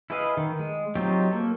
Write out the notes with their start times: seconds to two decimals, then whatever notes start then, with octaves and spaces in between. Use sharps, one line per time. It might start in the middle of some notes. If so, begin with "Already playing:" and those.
0.10 E4 G#4 B4 D#5 F5
0.37 D#3
0.59 G#3
0.95 F#3 C4 D#4 F4 G4
1.31 A#3 A4